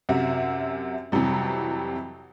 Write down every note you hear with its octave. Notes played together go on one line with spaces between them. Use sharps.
F#2 C3 F#4 E5
F2 C3 E3 F#3 G3